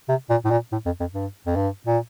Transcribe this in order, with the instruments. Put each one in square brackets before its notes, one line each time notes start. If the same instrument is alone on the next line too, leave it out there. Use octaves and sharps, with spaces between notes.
[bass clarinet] C3
A#2
A2
A#2
A2
F2
F2
G2
F2
G2
A#2